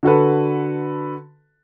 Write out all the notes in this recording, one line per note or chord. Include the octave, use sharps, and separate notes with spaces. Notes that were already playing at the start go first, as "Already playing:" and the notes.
D3 F#4 A4 B4